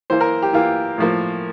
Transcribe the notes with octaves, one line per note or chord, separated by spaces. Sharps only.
E3 A#3 C5
A#4
G4
E3 A#3 F4
A2 F3 A#3